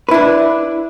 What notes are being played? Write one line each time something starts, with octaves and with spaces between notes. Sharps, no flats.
D4 E4 B4